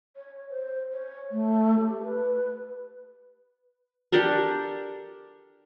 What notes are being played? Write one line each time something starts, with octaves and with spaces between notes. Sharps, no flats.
C#5
C5
C#5
A3
G4
B4
D4 G4 A4 A#4